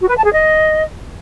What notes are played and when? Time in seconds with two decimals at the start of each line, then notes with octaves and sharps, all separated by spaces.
0.01 F#4
0.08 B4
0.16 A5
0.24 G#4
0.31 D#5